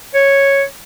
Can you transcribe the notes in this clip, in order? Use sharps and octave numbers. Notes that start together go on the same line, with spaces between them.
C#5